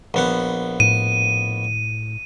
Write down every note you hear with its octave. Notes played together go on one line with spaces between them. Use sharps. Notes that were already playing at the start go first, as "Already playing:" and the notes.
A#1 B3 F#5
A2 D#7